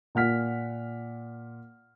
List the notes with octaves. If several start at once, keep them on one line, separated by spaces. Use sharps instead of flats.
A#2 F#5 F6 B6